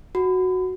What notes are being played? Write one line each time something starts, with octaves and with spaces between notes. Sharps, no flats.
F#4